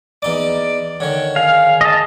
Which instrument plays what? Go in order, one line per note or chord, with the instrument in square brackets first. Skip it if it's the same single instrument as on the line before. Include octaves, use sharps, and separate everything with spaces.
[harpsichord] E2 D#4 D6 [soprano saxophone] D5
[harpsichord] D3 D#3 [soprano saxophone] C#5
[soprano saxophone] G#4 [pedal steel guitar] F5
[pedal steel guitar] D#5 A5